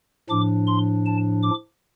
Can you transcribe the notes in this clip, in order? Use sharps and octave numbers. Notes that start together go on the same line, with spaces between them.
A2 F3 D4 D6
C6
A5
D6